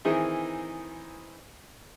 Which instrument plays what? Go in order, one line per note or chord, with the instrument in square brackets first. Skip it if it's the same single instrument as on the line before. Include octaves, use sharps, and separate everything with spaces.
[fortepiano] D#3 E3 C4 D#4 E4 G#4